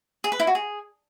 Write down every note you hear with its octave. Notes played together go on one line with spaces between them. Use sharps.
G#4
B4
E4
F#4
G#4